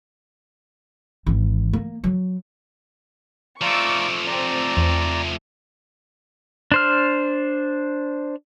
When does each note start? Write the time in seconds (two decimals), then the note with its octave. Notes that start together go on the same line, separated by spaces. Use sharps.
1.26 G#1 E3
1.73 A#3
2.04 F#3
3.61 F3 A3 F4 D5 A#5 C#6 D6 E6
4.27 C4 D5 A#5
4.77 E2
6.72 D4 C5 F6